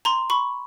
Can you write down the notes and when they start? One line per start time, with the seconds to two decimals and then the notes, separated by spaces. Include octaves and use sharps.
0.05 A#5 C6
0.30 B5 C#6